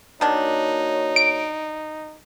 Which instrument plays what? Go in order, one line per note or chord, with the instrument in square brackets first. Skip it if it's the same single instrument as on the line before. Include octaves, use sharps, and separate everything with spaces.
[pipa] D#3 D4 [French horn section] A#3 F#4 C#5 [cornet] D#4
[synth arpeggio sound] D7